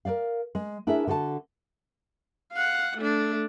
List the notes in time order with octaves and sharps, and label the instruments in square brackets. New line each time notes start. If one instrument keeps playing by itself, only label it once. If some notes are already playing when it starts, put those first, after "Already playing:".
[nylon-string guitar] A#4 C5 D5 F5
G#3
D4 E4 G#4 A#4 B4 E5
D3 F#4 A4 D5 A5
[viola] F5 F#5
A3 D4